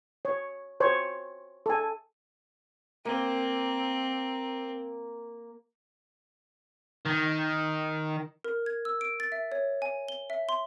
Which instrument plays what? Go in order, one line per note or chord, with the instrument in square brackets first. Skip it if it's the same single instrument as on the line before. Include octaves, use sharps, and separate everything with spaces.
[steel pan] C#5
C5 C#5
A4 G#5
[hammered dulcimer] A#3 [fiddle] C4
[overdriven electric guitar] D#3
[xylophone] A#4
G#6
E6
D7
A6
E5
C#5
G#5
G7
E5
C6